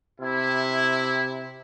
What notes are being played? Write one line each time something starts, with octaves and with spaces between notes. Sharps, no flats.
C3 E4